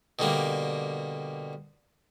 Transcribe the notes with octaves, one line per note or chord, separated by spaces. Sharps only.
B2 D3 G3 A#3